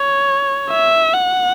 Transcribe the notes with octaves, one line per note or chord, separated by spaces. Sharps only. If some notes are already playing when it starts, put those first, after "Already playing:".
Already playing: C#5
E5
F#5